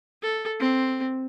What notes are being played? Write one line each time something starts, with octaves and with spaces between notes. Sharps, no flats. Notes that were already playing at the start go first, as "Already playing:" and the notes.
A4
C4